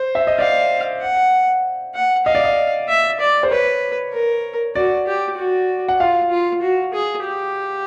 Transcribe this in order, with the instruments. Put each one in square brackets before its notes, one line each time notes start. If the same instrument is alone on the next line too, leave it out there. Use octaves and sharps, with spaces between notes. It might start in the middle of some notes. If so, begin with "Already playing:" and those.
Already playing: [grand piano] C5
E5
D#5
[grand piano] D5 [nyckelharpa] F5
[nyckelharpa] F#5
F#5
[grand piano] D#5 [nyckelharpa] F5
[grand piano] D5
D#5
[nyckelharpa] E5
D5
[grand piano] C5
[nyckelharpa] B4 [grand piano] C#5
[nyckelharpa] A#4
[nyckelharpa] F#4 [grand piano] D5
[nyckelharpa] G4
F#4
[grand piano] F#5
[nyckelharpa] F4 [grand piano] F5
[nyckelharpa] F4
F#4
G#4
G4